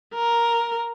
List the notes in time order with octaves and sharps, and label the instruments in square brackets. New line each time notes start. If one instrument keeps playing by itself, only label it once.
[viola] A#4